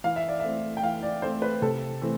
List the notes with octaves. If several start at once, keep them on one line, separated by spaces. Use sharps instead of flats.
E3 F5
E5
D5
A3 C4 E5
G5
E3 F5
D5
A3 C4 C5
B4
C3 A4
E3 A3 C4